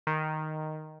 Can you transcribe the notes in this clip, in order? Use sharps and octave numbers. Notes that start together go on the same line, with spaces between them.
D#3